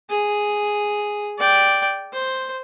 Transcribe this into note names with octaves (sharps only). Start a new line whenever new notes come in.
G#4
D5 G5
C5